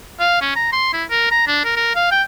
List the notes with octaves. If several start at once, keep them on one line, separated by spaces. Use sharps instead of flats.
F5
C#4
A#5
C6
E4
A#4
A#5
D4
A#4
A#4
F5
G5